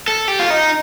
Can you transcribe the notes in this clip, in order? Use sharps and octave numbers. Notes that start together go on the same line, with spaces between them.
A4
G4
F4
D#4